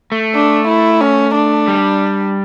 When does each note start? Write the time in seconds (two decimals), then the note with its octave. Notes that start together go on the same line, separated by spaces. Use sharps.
0.12 A3
0.35 D4
0.68 E4
1.01 C#4
1.35 D4
1.68 G3